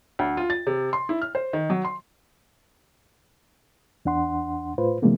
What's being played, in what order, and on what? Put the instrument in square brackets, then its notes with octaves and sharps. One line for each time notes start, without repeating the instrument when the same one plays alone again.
[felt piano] D2
F4
A6
C3
C6
E4
F6
C5
D#3
F#3
C6
[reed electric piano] E2 D4 F#5 C6
A2 F4 B4 C5
C3 E3 F#3 G#3 A#3 B3